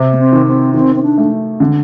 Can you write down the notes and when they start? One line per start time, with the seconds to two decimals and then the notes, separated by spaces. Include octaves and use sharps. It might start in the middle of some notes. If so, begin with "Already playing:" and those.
Already playing: C3
0.13 A#3
0.18 C4
0.32 D#3
0.46 C4
0.74 D#3 C4
0.95 C4
1.03 D4
1.18 A3
1.60 D3